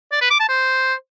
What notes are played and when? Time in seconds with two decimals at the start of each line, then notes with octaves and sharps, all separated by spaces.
0.12 D5
0.21 B4
0.30 D6
0.40 A5
0.49 C5